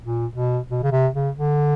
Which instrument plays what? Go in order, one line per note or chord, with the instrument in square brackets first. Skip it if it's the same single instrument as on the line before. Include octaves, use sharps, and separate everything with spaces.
[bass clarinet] A#2
B2
B2
C#3
C3
C#3
D3